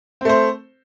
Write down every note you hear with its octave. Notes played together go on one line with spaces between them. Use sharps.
A3 C4 C5